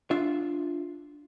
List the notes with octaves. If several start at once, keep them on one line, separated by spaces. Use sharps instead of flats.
D4 F4 E5